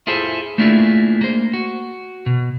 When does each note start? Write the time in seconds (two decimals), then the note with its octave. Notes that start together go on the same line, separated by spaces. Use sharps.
0.07 E4 F4 G#4 A4 C5 E5
0.58 A3 A#3 D4 E4 F4 G#4
1.21 A#3 C5
1.54 F#4
2.26 B2